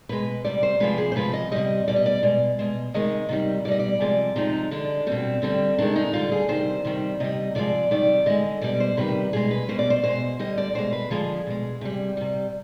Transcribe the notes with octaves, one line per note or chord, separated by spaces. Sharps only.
B2 G#3 B4
C3 G3 D5
C5
C3 F3 G#3 B4
G#4
C5
C3 F3 G#3 B4
D#5
C3 G3 D#5
B2 G3 D5
D#5
D5
B2 G#3
B2 G#3
C3 D#3 G#3 D#5
C3 D#3 G3
B2 G3 D5 D#5
D5
C3 F3 G#3 D5
C3 F3 G#3 D#4
D3 G#3 D4
B2 G3 C4
D3 G3 C4
C3 D#3 G#3 D4
D#4
D3 G3 F4
G#4
C3 D#3 G3 C5
C3 D#3 G3
C3 G3 D#5
C3 F3 G#3 D5
C3 D#3 G3 D5
D3 G#3 D#5
B2 G3 D5
C5
C3 D#3 G3 B4
B2 G#3 G#4
B4
B2 G3 C5
D5
C5
B2 G#3 C5
D3 G3 D#5
D5
B2 G#3 C5
B4
D3 F3 G#3 G#4
B2 G#3
C3 G3
C3 G3